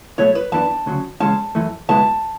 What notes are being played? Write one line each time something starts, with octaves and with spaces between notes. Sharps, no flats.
B2 F#3 A3 C#5
B4
F#2 E3 B3 D4 A5
D2 C#3 F#3
E2 C#3 G#3 C#4 A5
F#2 E3 A3
C#2 B2 G#3 B3 E4 A5